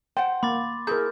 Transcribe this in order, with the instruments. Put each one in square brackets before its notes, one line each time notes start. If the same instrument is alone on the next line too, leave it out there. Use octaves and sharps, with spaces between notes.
[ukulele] C5 F#5 [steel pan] G5 [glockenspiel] C6
[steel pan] A#3 [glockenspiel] B5 D6 A6
[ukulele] E4 G#4 [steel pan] A#4 A#5 [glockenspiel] G6